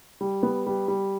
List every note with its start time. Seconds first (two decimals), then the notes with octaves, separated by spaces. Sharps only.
0.21 G3
0.43 B3
0.66 G3
0.88 G3